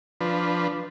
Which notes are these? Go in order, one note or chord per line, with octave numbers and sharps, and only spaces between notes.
F3 D4 B4